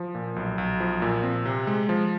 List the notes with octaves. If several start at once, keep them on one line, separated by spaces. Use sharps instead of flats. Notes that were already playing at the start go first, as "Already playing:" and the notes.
Already playing: F3
A#2
B1
B1
F3
A#2
C4
C3
G#3
F3